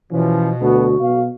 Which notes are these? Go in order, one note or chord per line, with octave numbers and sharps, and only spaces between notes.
B2 E3 F3 C#4
D2 B3 F#4 A4
B1 B2 F5